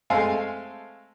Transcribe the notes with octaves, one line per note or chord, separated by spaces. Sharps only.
G#3 A3 C4 A4 F5 G#5